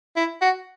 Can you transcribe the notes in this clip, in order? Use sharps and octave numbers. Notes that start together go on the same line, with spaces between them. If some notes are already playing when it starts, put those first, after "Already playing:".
E4
F#4